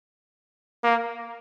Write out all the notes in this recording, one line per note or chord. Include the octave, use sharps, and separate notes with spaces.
A#3